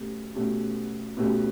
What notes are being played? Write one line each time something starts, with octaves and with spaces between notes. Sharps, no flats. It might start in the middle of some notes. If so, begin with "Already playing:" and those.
Already playing: B2 A3 C#4 G4
B2 A3 C#4 G4
B2 A3 C#4 G4